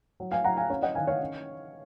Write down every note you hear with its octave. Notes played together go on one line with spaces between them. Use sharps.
F#3
F5 G#5
F#3 F#5 A#5
F5 G#5
C#4 C#5 F5
D#5 F#5
D#3 F5 G#5
C#5 F5
C#4